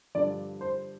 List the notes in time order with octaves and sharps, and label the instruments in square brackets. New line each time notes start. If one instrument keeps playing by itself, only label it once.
[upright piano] G2 D3 F3 D5
C5